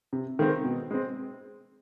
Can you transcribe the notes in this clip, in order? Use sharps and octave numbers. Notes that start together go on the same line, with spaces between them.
C3
D#3 G#3 C4
B2
G#3 C4